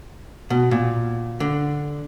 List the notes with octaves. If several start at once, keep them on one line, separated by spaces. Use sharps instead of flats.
B2
A#2
D3